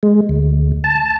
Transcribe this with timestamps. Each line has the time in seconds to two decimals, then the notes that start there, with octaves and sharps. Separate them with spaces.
0.03 G#3
0.29 D2
0.84 A5